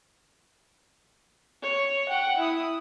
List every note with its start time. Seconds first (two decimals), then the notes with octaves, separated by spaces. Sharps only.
1.63 C#5
2.09 F#5 G5
2.38 E4 D#6